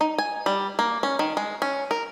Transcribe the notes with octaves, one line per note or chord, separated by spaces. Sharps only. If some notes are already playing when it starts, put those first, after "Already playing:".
D#4
G#5
G3
A#3
C#4
D#3
G#3
C#4
A#4